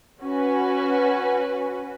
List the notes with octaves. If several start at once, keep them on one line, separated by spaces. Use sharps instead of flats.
C#4 F#4 B4